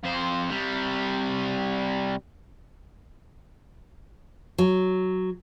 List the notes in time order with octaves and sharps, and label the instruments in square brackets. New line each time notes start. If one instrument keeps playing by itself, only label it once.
[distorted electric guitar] F2 C5
C3 G3
[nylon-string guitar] F#3